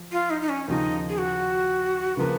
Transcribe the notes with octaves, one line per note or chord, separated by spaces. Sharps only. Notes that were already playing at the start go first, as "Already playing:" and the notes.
Already playing: F3
F4
D#4
D#4
C#4
D#2 C#3 F3 D#4
G#4
F#4
C#3 F3 A#3 B4